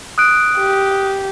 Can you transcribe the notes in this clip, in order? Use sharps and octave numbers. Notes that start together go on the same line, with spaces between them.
D#6 F#6 D7
G4